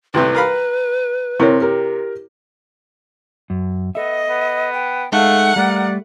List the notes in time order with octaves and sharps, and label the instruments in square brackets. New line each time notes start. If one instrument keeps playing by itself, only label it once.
[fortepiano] C2 A2 C3 [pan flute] B4
[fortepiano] A#4 F5 B5
[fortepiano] C3 [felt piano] C4 A#4 [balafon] E4 C#5
[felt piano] G4 A#4
[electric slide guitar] F#2
[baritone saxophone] B3 [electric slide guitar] A4 E5 [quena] D#5
[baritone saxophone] B3
[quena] G5
[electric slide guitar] G#3 D#4 A4 [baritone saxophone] A3 [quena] F5 [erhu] F#5
[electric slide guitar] G3 A3 [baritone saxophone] A#3 [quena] D5